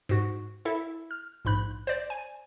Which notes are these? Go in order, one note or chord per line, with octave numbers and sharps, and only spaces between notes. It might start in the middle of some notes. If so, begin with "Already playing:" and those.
G#2 F#4
E4 A4 E5
F6
A#1 G#2 B5 F#6
C5 D5
G#5